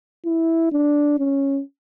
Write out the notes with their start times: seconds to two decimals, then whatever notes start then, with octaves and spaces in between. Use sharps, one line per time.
0.26 E4
0.72 D4
1.19 C#4